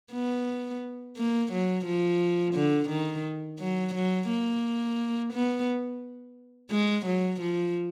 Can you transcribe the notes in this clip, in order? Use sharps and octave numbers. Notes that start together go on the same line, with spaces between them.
B3
A#3
F#3
F3
D3
D#3
F#3
F#3
A#3
B3
G#3
F#3
F3